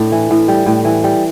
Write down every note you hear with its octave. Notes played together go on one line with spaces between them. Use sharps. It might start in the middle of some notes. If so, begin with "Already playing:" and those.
Already playing: A2 D4 D5
E3
A2
G3
A2
E3
G3